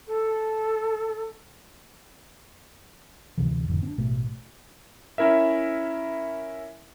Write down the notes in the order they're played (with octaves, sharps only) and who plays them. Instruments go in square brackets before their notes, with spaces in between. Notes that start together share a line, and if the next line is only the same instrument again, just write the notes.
[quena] A4
[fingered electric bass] D2 C3 E3
F1 F2 A2 D3
C4 D4
A1 B2 A3
[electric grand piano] C#4 E4 A#4 E5